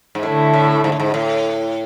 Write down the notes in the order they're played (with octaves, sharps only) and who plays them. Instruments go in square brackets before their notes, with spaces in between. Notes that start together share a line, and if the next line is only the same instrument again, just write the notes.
[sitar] G#2
[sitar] A2 [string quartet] D3 A3 E4
[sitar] A2
G#2
A2
G#2
A2